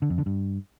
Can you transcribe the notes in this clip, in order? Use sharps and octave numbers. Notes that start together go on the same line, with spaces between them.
D3
F2
D3
G2